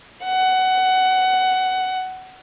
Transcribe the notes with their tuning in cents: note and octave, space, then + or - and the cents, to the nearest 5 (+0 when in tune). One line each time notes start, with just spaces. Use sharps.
F#5 +15